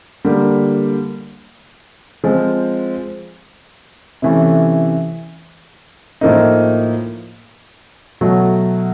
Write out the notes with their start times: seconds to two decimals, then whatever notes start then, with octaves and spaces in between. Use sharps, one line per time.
0.25 D3 G3 A#3
2.24 F3 G#3 C4
4.22 C3 E3 A3 C#4
6.21 A2 F3 A#3 D#4
8.21 B2 F#3 A3